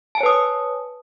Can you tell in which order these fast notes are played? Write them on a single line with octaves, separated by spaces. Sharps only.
A5 G#5 C#5 B4 D#6